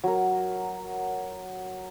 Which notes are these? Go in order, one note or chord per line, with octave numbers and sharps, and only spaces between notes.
F#3 A#4